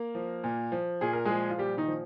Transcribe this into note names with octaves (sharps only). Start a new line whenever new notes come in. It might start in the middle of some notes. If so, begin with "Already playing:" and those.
Already playing: A#3 A#4
F3
A#2
F3
A#2 G#4
A#4
F3 G#3 G#4
F4
A#2 G3 G4
D#3 D#4
F3